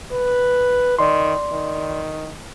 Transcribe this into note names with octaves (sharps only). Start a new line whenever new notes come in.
B4
D#3 D5 C6
D#3